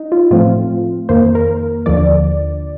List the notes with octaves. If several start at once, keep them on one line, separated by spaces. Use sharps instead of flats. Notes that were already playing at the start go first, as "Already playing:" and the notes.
Already playing: D#4
F4
A2 F3 A3 C4 F4
F2 D#3 A#3 C5
A#4
D#2 D3 F3 D5